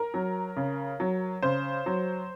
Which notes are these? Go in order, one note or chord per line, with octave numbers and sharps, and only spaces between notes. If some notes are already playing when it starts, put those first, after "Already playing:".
Already playing: A#4
F#3
C#3
F#3
C#3 C5
F#3